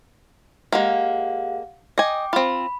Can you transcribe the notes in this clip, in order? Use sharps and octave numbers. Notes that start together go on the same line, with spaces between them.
G#3 A#3 G4 F5 F#5
D#5 G5 G#5 D6
C4 F4 B5